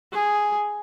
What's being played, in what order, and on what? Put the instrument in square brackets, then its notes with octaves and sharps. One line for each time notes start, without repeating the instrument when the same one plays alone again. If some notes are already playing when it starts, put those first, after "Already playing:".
[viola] G#4